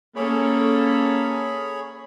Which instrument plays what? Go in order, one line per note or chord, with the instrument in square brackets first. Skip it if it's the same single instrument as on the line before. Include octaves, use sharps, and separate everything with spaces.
[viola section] A#3 C#4 A4 [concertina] G#4 C#5 B5